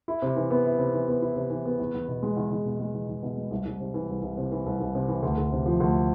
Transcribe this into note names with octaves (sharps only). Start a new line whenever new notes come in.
E4
C3
E3
B3
E4
C3
E3
B3
E4
C3
E3
B3
E2
E2
B2
G#3
E2
E2
B2
G#3
E2
E2
B2
G#3
C2
C2
C3
E3
C2
C2
C3
E3
C2
C2
C3
E3
D2
D2
C3
F3
D2